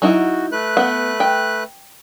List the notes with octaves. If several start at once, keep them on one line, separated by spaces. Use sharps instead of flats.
F#3 D#4 E4 F#4
A3 B4 F#6
B3 F#5
G5